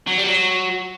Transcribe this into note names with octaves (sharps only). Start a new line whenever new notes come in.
F#3
G3
F#3